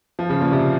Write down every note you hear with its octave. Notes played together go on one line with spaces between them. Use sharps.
F3
C#3
A#2
C3